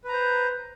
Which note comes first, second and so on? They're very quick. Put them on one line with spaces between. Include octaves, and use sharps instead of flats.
B4 A#5 C5